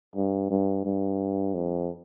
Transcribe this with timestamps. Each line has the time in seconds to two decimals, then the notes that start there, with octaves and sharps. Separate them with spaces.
0.16 G2
0.50 G2
0.85 G2
1.54 F2